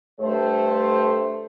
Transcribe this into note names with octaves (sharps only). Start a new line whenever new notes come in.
G2 A3 C5